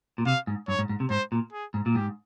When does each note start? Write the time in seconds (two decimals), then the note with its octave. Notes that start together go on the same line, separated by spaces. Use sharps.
0.18 A#2
0.26 C3 F5
0.47 G#2
0.68 G2 C#5
0.79 G#2
0.89 G#2
1.00 C3
1.10 G#2 C5
1.32 A#2
1.52 G#4
1.74 G#2
1.86 A#2
1.95 G#2 G4